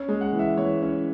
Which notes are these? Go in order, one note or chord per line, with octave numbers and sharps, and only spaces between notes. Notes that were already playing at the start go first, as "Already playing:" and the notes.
Already playing: C#4
G#3
F#5
E3
E5
E3 C#5
C#4